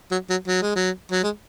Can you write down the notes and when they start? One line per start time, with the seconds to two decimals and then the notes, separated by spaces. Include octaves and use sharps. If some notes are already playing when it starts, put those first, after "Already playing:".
0.11 F#3
0.30 F#3
0.47 F#3
0.62 G#3
0.76 F#3
1.12 F#3
1.23 G#3